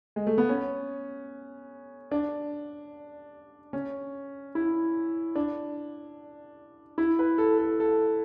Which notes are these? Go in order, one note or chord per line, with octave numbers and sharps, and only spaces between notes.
G#3
A3
B3
C#4
D4
C#4
E4
D4
E4
B4
A4
A4
A4